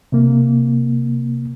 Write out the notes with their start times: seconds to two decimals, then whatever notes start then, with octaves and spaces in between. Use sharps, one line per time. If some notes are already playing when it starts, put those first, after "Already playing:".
0.12 C3 A#3